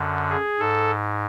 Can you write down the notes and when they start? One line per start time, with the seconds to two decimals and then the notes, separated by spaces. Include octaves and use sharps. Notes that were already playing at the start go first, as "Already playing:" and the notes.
Already playing: F#2 D3
0.30 G#4
0.59 G#2 A4